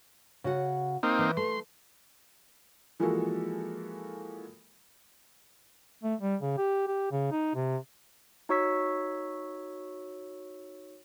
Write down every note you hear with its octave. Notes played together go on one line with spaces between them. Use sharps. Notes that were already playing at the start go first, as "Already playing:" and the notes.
C#3 F#4 F#5
A#3 C4 D#4
E3
A3 C6
E3 F3 G#3 A#3 F#4 A4
A3
G3
C#3
G4
G4
C#3
D#4
C3
D#4 F#4 C#5 C#6 E6 B6